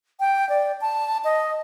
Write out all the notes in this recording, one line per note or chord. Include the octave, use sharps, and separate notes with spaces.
G5
D5
A5
D#5